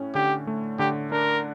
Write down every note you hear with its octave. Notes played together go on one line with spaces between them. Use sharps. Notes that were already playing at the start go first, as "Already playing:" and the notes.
Already playing: A2 C#4
D3 G4
A3
D3 G4
D4 A#4